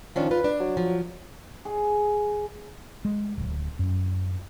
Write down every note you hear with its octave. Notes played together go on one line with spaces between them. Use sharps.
D#3 F3 C#4 D4
F4 B4
D4
F#3
F3
G#4
G#3
D1
F#2